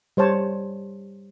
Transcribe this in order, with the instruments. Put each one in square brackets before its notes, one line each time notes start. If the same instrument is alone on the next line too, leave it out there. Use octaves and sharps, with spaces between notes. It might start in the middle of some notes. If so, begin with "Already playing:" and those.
[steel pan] G3 C5 C#5 A5